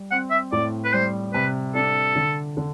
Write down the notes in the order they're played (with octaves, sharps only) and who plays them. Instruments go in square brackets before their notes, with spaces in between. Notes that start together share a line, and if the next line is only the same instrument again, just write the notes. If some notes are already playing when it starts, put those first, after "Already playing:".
Already playing: [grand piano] G3
[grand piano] C4 [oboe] F#5
[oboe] E5
[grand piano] A2 [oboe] D5
[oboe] B4
[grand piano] G3 [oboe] C5
[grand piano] C3 [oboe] B4
[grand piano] D4 [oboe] A4
[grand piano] D3
D3